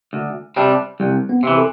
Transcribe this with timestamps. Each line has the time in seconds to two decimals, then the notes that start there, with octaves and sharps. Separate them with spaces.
0.13 D2
0.56 C3 G3 D4
1.00 C2 G3
1.29 B3
1.43 C3 E3
1.58 A4